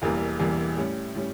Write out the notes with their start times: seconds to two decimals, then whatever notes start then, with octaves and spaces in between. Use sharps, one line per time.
0.02 E1 E2 E3 G3 A#3
0.39 E1 E2 E3 G3 A#3
0.78 A2 G3 C#4
1.15 A2 G3 C#4